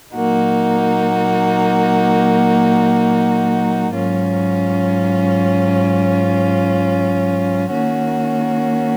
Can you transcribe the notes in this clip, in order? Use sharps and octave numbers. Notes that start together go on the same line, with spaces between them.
A#2 F#3 A#3 D#4 F#4
G#2 F#3 C#4 F4
D#3 A#3 C#4 F#4